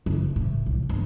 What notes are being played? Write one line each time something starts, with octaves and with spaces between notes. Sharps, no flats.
F#1
A2
C2
G1